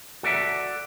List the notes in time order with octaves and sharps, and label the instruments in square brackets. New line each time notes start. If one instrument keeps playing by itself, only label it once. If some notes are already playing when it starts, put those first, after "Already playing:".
[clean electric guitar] F#4 A4 D5 E5